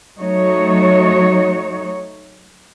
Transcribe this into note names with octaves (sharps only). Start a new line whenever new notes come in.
F#3 A3 D#4 F#4 C#5